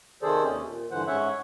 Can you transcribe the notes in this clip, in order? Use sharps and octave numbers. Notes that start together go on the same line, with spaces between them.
C3 D#3 G#4 A4 C5 D5
D#2 C3 C#4
A#2
G2 D3 E3 C5 F#5
G#2 C#4 C#5 E5 F#5
C#5